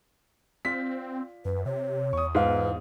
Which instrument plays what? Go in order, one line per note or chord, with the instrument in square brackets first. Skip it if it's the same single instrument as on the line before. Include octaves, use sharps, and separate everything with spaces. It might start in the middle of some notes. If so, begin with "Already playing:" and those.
[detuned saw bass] C4 [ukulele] F4 D5 [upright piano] B6
[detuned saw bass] F#2 [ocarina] B4
[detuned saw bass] C3 [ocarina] C#5
[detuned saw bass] E2 [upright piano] C#6 D#6
[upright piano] G#2 [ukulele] F4 F5 [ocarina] B4